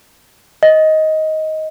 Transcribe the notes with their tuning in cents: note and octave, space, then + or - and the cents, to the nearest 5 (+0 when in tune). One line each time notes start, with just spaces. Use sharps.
D#5 +15